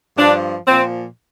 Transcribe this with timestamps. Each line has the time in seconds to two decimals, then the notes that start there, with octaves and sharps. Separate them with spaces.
0.17 G2 F3 D4
0.67 A#2 F3 C4